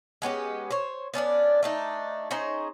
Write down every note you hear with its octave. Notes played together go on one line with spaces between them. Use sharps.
G#3 B3 C#4 G4
C5 C#5
B3 C#4 D4 D5
A3 D4 D#4
C#4 D#4 G#4 C5